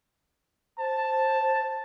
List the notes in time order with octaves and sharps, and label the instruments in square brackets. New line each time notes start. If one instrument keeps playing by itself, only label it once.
[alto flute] C5 [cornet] A5